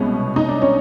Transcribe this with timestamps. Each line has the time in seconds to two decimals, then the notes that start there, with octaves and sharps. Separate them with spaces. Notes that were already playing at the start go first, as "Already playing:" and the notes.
Already playing: C2 B2 G#3 B3 C#4
0.36 D#4
0.48 D4
0.62 C#4